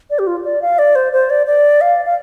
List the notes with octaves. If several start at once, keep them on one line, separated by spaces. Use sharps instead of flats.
D5
G4
F4
D5
F5
D5
C5
C5
D5
D5
F5
F5